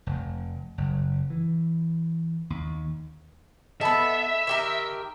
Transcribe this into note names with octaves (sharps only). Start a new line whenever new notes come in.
F1
F#1
E3
D#2
B3 A4 D#5 E5 A5 B5
D#3 G4 A#4